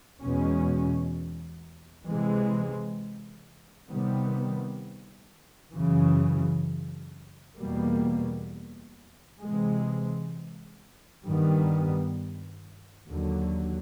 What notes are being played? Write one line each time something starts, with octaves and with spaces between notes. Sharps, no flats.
E2 B2 G#3 C#4
C3 E3 G#3
C3 D#3 G3 B3
F#2 C#3 E3
E2 B2 G3 A#3
C3 E3 G#3
G2 D#3 G3 B3
D#2 D3 F#3